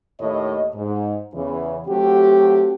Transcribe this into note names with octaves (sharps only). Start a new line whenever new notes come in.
D#2 A2 C#5 D#5
G#2
E2 C#3 E3
F#3 A3 C4 F#4 G4